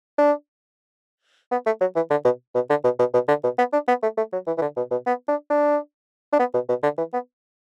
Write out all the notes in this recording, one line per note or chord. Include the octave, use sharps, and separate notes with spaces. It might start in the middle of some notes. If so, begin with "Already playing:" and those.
D4
B3
A3
F#3
E3
D3
B2
B2
D3
B2
B2
B2
D3
B2
B3
D4
B3
A3
A3
F#3
E3
E3
D3
B2
B2
B3
D4
D4
D4
B3
B2
B2
D3
E3
B3